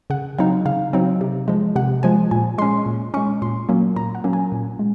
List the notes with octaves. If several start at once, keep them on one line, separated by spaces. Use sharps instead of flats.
C#3 F#5
F#3 C4 D#4 F5
C#3 F5
F#3 C4 D#4
C3
F3 G#3
C3 F#5
F3 G#3 G#5
A#2 G#5
G#3 C#4 C6
A#2
G#3 C#4 C#6
A#2 C6
F#3 A#3 C#4
A#2 A#5
F#5
F#3 A#3 C#4
G#5
A#2
G#3